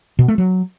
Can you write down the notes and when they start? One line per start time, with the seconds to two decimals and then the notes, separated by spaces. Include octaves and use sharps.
0.19 B2
0.28 A3
0.38 F#3